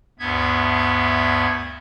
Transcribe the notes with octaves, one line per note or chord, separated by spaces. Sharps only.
D2 G2 B3 E5 G#6